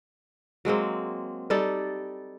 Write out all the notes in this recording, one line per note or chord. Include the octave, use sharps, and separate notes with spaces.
F#3 G#3 A#3 C4
G3 D#4 A4 D5